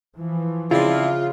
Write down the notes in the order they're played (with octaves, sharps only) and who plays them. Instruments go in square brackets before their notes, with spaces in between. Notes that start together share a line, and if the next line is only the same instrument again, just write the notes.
[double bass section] E3 F3
[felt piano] C#3 [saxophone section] C4 D4 E4 [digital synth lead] F4